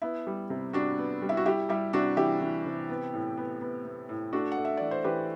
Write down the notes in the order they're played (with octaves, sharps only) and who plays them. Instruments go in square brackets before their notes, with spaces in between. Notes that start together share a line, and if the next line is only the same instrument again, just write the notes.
[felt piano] B3 E4
G3
C3
G3 D4 F#4
B3
G3
E4
F#4
G3 E4 G4
G3 E4 G4
C3 D4 F#4
E3 E4 G4
E3
C3
B3
A2
B3
B3
B3
A2
A3 D4 F#4
F#5
A3
E5
E3 D5
C5
E3 G4 B4